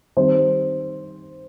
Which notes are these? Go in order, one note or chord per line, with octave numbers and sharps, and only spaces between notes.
D#3 G3 C4 C5